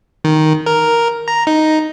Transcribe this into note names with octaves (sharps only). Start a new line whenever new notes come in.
D#3
A#4
A#5
D#4